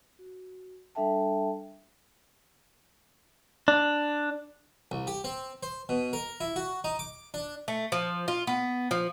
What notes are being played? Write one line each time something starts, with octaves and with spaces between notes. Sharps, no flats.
F#4
G3 D4 A4 E5 G5 A5
D4
C2
G4
C4
C5
B2
A#4
E4
F#4
D#4
D6
D4
A3
F3
F4
B3
F3